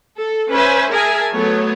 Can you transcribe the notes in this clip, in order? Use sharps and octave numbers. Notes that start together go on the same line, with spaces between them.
A4
C#4 B4 C5 E5 G#5
G#4 A#4 E5 G#5 A5
F#3 A3 B3 C#5